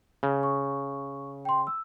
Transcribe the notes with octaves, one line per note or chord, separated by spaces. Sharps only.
C#3
C#6
G5 C6
E6